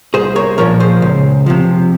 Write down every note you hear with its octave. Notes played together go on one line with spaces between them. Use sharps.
C2 G#4 C5
A#4 C#5
A#2 F3 A#4 C#5
G#4 C5
C#2
C3 F3